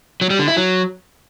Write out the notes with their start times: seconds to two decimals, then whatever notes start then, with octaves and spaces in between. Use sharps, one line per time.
0.21 F#3
0.30 G3
0.39 D3
0.48 E4
0.57 F#3